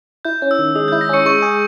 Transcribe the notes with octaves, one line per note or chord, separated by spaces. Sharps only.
E4 G6
C#4
E6
D#3
G#3 D#6
E4 G6
A#6
C#4 C#6 C#7
G#3 C#6 C#7
G#4